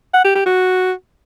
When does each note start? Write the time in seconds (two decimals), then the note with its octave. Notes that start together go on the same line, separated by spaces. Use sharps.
0.14 F#5
0.25 G4
0.35 G4
0.46 F#4